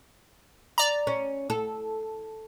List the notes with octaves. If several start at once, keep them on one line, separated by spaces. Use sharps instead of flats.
D5 A#5
C#4
A4